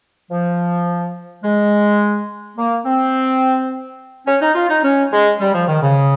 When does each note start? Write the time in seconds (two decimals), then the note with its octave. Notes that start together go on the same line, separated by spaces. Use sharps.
0.31 F3
1.44 G#3
2.57 A#3
2.85 C4
4.27 C#4
4.42 D#4
4.55 F4
4.69 D#4
4.84 C#4
5.12 G#3
5.40 G3
5.54 F3
5.68 D#3
5.82 C#3